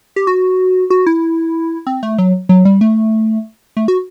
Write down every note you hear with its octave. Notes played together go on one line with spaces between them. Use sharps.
G4
F#4
F#4
E4
C4
A3
F#3
F#3
G3
A3
A3
F#4